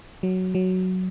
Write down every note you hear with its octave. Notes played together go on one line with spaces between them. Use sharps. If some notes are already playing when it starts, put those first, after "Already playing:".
F#3
F#3